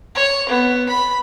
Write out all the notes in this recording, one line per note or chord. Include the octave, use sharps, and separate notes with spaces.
C#5
B3
B5